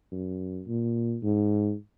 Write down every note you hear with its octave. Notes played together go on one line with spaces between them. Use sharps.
F#2
A#2
G#2